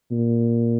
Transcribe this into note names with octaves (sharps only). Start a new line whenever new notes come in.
A#2